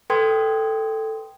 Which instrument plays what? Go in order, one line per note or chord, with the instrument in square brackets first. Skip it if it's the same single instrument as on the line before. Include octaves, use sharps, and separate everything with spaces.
[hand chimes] A4 B4 G5 C6 D#6 G#6